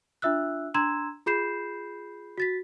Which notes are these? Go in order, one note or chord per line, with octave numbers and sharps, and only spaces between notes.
D4 F4 E5 E6 F#6
D4 A#5 C6 E6 G#6 E7
F4 G#4 B5 G6 C7 E7
F#4 A6 B6